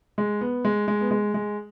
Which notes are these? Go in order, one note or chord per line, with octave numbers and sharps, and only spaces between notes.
G#3
B3
G#3
G#3
B3
G#3
G#3